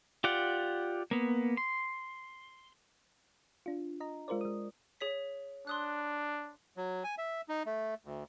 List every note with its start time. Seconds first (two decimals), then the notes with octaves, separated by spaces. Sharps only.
0.24 F4 G4 D5 F#5
1.11 A#3 B3
1.57 C6
3.66 D4 F4
4.00 D#5 A#5
4.28 G#3 F4 A#4 C5 D5
4.41 G#3 D#6
5.01 G#4 C#5 B6
5.67 D4 C6 D#6 F#6
6.77 F#3
7.04 G#5
7.18 E5
7.49 D#4
7.66 A3
8.05 D2